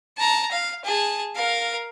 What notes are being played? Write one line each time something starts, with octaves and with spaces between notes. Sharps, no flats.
A5 A#5
F5
G#4 A5
A#4 F5